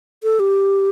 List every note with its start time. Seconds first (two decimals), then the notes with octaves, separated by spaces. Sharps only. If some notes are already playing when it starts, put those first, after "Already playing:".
0.23 A4
0.40 G4